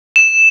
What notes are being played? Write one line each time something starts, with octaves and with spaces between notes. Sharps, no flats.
E7